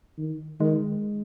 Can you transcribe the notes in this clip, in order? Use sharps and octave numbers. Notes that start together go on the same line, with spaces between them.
D#3
D#3 G#3